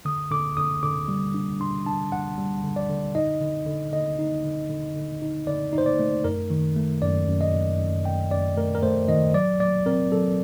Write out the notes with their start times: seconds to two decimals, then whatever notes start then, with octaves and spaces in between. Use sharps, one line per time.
0.05 D3 D#6
0.31 D3 D6
0.57 D3 D#6
0.83 D3 D6
1.08 G3
1.34 D4
1.60 D4 C6
1.86 D4 A5
2.12 D4 F#5
2.38 G3
2.64 D3
2.76 D5
2.89 D3
3.15 D#4 D#5
3.41 D3
3.66 D3
3.92 D3 D#5
4.19 D#4
4.44 D3
4.70 D3
4.96 D3
5.22 D#4
5.47 D3 D5
5.73 D#4
5.78 C5
5.86 D5
5.99 A3
6.24 F#2 A#4
6.50 D#3
6.76 A3
7.02 F#2 D5
7.28 F#2
7.41 D#5
7.54 F#2
7.80 F#2
8.05 F#2 G5
8.31 F#2 D5
8.57 A3 A#4
8.75 A#4
8.83 A3 C5
9.08 D#3 D#5
9.34 F#3 D5
9.60 F#3 D5
9.86 C4 A#4
10.12 F#3 A4